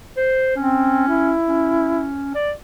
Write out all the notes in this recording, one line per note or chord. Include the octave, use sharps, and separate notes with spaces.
C5
C4 C#4
E4
C#4
D5